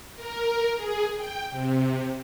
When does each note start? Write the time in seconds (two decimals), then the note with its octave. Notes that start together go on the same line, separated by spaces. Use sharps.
0.16 A#4
0.76 G#4
1.17 G5
1.51 C3